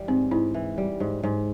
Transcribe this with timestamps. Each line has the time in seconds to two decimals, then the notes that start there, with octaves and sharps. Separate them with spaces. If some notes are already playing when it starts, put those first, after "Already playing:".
Already playing: E3 G3
0.08 G#2 C4
0.31 G#2 E4
0.54 E3
0.78 G3
1.00 G#2
1.23 G#2